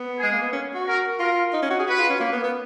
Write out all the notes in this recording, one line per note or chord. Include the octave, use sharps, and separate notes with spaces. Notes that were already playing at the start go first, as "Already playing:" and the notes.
Already playing: B3
G#3 G#4
A#3
B3
C#4
F#4
A#4
F4 A#4
D#4
C#4
F#4
G#4
F#4 B4
F4
C#4
A#3
B3
B3